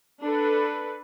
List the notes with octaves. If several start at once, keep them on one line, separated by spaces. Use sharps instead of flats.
D4 A4 B4